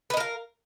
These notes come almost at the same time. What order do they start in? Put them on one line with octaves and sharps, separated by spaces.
B4 D#5 A#4 F5